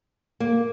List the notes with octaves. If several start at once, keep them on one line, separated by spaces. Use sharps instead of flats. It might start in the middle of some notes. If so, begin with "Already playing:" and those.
A#3